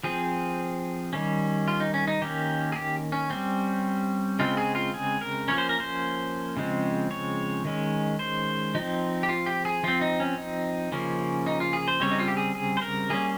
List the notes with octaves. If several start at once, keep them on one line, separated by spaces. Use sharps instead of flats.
F3 C4 G#4
D#3 G3 C#4
F4
D#4
C#4
D#4
D#3 A#3 C#4 G4
G#4
G4
C#4
G3 C4
C#3 G#3 C4 F4
G#4
F4
G#4
A#4
F3 A#3 C#4 C#5
C5
A#4
C5
C#3 F3 G#3 C4
C#5
D#3 G#3 C#4
C5
F3 C4 D#4
G4
F4
G4
G#4
F3 C4 F4
D#4
C#4
D#4
C#3 F3 A#3 C#4
D#4
F4
G#4
C5
C#3 G3 C4 C#5
D#4
F4
G4
G#4
G#4
C5
A#4
G3 A#3 C#4 G#4